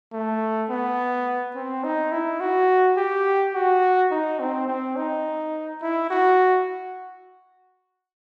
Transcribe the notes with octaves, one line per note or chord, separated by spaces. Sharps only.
A3
B3
C4
D#4
E4
F#4
G4
F#4
D#4
C4
C4
D#4
E4
F#4